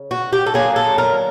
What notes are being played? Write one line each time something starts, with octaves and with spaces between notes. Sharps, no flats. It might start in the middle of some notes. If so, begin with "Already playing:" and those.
Already playing: C#3
F#4
G4
A4
D3 F#3 A#3 G#4
A4
A#4